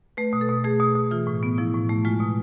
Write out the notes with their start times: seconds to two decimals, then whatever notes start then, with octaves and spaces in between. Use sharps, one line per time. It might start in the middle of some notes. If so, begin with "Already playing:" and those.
0.17 A3 B4
0.33 B2
0.41 A4
0.49 B2
0.64 A3 G#4
0.80 B2
0.95 B2
1.11 E3 F4
1.27 A2
1.43 B3
1.58 F3 E4
1.74 A2
1.89 A3
2.05 G#3 F4
2.20 B2